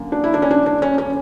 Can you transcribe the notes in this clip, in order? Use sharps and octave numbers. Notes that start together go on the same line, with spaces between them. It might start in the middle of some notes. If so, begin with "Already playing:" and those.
Already playing: F#2 D3 A#3
D4
E4
D4
C#4
D4
D4
C#4
C#4